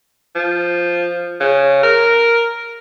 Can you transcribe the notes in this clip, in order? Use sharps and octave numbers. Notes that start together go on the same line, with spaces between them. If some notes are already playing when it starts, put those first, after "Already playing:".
F3
C#3
A#4